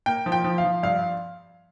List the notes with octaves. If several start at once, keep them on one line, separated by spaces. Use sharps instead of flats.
A#3 G5
F3
G5
F3
F5
F3
G2 F5